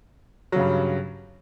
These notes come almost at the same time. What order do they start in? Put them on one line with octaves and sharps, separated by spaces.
F#3 C#3 G2